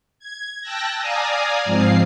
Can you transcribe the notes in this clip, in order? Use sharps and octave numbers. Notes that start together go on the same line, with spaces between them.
G#6
G5 A5 E6 F#6 A#6
D5 F5 G#5 A#5 D#6
G#2 F3 C4 F5 C7